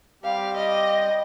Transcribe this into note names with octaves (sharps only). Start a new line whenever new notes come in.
G3 C4 G4 F5
D#5